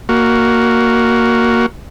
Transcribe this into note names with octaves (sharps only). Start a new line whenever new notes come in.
A#3 F#4